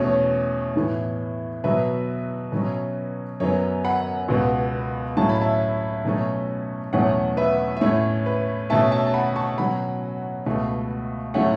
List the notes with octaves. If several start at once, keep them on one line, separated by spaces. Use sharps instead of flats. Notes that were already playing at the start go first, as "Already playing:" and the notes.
Already playing: E2 B2 A3 C#4 C#5
A2 E3 B3
B2 F#3 B3 B4 E5
B2 F#3 C#4
F#2 F#3 B3 C#5
F#5 B5
C#2 B2 B3
A2 F#3 A3 C#4 A5
B5
E5 A5
B2 F#3 A3 C#4
E2 B2 F#3 A3 C#4 C#5 F#5
B4 E5
E5
A2 A3 C#4 C#5
B4
B2 A3 C#4 E5 A5
E5 A5
A5
F#5 B5
A5 C#6
B2 F#3 C#4 F#5 B5
C#2 B2 A3
A2 F#3 A3 C#4 C#5 F#5